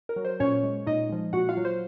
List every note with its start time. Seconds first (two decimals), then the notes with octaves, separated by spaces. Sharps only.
0.09 A#4
0.16 F#3
0.25 C5
0.40 A#2 C#4 C#5
0.63 G#3
0.87 A#2 D#4 D#5
1.10 F3 G#3
1.33 A#2 F#4 F#5
1.49 F4 F5
1.57 F#3
1.65 C5